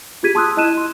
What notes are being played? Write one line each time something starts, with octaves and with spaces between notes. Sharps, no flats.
F4 G4 G#4 G#6 B6 D#7
A5 C6 D#6 E6 F#6
E4 D#5 A5 F#6 D#7 E7
C6